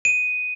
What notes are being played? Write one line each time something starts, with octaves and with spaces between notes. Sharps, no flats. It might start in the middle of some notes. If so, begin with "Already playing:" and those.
D#7